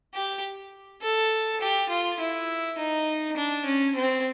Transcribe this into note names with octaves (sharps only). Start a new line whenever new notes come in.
G4
A4
G4
F4
E4
D#4
D4
C#4
C4